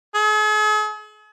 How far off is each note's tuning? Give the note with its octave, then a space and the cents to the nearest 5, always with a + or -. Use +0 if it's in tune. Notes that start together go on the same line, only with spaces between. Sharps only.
G#4 +45